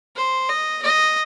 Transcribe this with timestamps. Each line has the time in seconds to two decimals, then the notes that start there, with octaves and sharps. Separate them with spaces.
0.16 C5
0.49 D#5
0.83 D#5